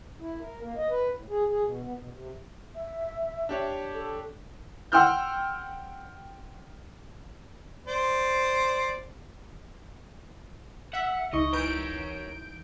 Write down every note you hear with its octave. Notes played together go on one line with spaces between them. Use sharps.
E4
A#4
A#3
D#5
B4
A2
G#4
G#4
B2
B3
B2
C3
E5
D4 G4 C#5
A4
F#5 G5 C6 E6 F6 G6
C5 D5
E5 F#5
C#2 D#4 D#5 C#6
E3 A#4 C#5 G6 D7